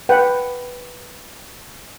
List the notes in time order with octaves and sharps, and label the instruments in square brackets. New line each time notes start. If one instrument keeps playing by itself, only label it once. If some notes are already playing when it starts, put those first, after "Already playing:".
[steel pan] B4 F#5 G5